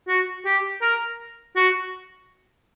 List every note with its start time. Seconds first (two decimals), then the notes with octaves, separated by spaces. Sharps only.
0.08 F#4
0.46 G4
0.82 A#4
1.56 F#4